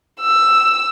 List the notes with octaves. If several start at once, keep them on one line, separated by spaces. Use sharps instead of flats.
E6